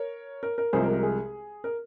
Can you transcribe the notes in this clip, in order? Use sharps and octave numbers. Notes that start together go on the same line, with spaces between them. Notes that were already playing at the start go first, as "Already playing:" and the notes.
Already playing: A#4 C#5
A#4
A#4
C2 C3 F3 G#3 G#4 C5
A#4
A#4
G#4
A#4